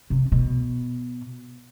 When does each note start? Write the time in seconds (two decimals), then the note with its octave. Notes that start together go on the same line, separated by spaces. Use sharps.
0.10 C3
0.32 B2